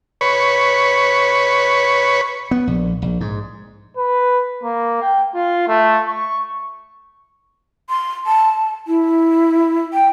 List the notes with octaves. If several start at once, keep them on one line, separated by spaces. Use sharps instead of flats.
B4 C#5
B3
A#1
A#1
G#2
B4
A#3
G5
F4
A3
C#6
C6
A5
E4
G5